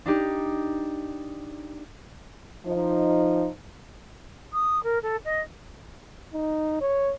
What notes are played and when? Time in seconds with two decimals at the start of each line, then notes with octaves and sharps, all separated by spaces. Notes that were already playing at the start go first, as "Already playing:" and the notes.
0.06 D4 D#4 G4
2.66 F3 D#4
4.52 D#6
4.83 A#4
5.02 A4
5.24 D#5
6.34 D#4
6.81 C#5